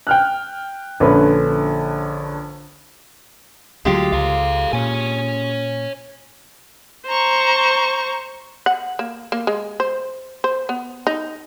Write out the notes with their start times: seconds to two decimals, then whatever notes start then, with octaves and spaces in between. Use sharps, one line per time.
0.07 G5 F6 F#6
1.00 A#1 D3 C#4 B4
3.85 D2 F#3 G#3 F4 G4
4.13 C#2 A4 F5
4.73 A#2 C#5 G#5
7.06 C5 A#5 C#6
8.66 F#5
8.99 A#3
9.32 A#3
9.47 G#3
9.80 C5
10.44 C5
10.69 B3
11.07 D#4